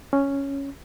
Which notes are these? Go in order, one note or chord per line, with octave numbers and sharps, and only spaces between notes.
C#4